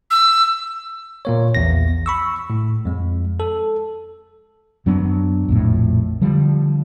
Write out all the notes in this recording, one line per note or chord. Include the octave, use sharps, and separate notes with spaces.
E6
A#2 A#3 C#5
A#1 E2 A#6
B5 C#6 E6
A2
F2 G#3
A4
F#2 F#3 B3 D4
A#1 F2 A2
D3 F3 G3